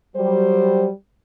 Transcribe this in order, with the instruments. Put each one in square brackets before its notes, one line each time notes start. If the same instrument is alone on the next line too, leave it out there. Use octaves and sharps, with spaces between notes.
[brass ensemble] F#3 G3 [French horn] C5